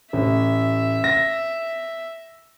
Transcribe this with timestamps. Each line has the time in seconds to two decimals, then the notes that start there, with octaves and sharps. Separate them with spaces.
0.13 A1 E5
1.04 A#6